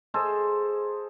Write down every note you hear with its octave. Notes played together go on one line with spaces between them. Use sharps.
G#4 A4 C5 D#5